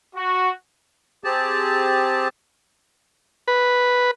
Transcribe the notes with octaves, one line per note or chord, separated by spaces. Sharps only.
F#4
C4 G4 G#4 A5
B4